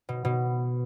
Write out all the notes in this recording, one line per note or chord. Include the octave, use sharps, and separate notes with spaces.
B2
B2